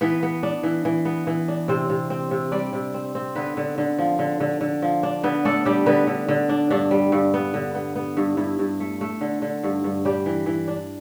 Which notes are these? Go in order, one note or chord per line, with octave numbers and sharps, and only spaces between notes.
E3 B3 B4
B3
D4
E3
E3
B3
E3
D4
C3 C4 C5
C3
C4
C3
G3 D4 D5
C3
C4
C4
D3 B3 B4
D3
D3
F3
D3
D3
D3
F3
D4
D3 B3 B4
A3 D4 A4
G3 D4 G4
D3 B3 B4
D3
D3
D4
G2 D4
G3
G2
B3
D3
B3
B3
G2
G2 E4
G2
A3
A3
D3
D3
G2
G2
G3 D4 G4
E3
E3
D4